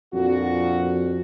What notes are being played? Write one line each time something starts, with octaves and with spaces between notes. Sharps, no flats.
F2 A#2 D4 F#4